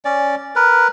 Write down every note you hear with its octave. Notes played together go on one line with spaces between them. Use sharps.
C#4 D5
A#4 B4